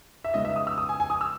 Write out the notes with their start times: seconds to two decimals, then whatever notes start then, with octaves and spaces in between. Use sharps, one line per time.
0.24 E5
0.34 C#3 G#3 B3 D#4 D#5
0.45 E5
0.56 D#6
0.67 E6
0.78 D#6
0.89 G#5
1.00 G#5
1.10 D#6
1.21 E6